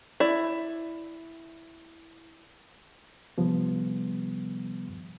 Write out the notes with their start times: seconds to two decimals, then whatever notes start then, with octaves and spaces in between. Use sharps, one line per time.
0.20 E4 D5
3.38 C3 D#3 F3 G3 B3